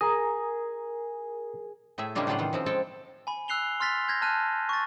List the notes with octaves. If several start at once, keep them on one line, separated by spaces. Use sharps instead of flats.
G#4 A#4 A#5 D#6
A2 A3 G#4 E5
C#3 G3 G#3 A#3 D4 F4
A2 C#3 F#3 D4 F4 F#5
D#3 E3 F4
C#3 F3 C4
G#3 A4 G5 A5
G#5 B5
E6 F#6 C7 F7 G7
C6 F6 A6 B6 F7
G6 G#6 A#6
A5 F6 F#6 D#7
C#6 A6